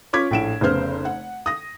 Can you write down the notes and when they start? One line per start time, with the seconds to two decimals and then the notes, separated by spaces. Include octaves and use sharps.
0.13 C#4 F4 D6 G#6 B6
0.31 A#1 A2 D7 E7
0.61 F1 C#3 B3 C5 F6
1.05 F#5
1.46 D#6 A#6